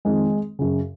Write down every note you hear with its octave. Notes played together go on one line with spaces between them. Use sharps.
F2 D#3 G#3
F#2 C#3